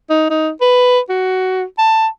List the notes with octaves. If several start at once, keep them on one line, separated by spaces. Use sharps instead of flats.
D#4
D#4
B4
F#4
A5